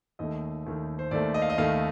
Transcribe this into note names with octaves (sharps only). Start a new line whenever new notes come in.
D#2 D#3 A3 D#5
D#2 D#3 A3
C5
D#2 D#3 A3 D5
D#5
F5
D#5
D#2 D#3 A3 F5